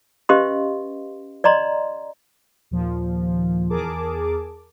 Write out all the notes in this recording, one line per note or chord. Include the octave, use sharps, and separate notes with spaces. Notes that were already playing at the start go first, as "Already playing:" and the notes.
C#4 G4 B4 D#5 F5 C6
D5 D#5 A#5 C6
D#2 A#2 F3
E2 G#4 A#4 A5 D6